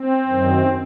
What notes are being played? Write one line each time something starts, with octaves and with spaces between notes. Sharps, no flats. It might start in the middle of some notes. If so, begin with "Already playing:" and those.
Already playing: C4
F#2 D#3